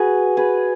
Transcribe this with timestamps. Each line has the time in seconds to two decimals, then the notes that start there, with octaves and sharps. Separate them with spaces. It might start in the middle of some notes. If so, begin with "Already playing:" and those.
Already playing: F#4 G#4 B4
0.37 G#4 B4